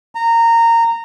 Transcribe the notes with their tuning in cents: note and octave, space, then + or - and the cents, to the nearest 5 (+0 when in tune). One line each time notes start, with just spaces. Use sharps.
A#5 -15